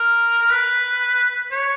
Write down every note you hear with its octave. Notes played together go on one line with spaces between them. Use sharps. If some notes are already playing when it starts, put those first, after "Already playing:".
Already playing: A#4
A#4
B4
C#5